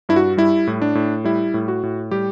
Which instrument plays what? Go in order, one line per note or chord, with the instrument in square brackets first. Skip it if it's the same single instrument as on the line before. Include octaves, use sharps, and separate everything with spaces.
[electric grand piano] G2 E4
F#4
G3 E4
A2
D4
A2
G3 E4
A2
F#4
A2
G3 G4